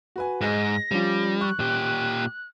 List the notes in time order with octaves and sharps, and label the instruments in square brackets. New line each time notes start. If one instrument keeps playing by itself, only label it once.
[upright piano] F#4 B4 G#5
[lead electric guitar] G#2 [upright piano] G#4 D#5 [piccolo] A#6
[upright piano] F3 C#4 F4 [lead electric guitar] G3
[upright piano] C#6 [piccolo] F#6
[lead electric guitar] A#2 G4